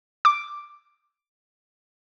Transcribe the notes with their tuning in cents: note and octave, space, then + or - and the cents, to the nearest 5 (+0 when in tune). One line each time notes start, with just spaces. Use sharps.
D6 +5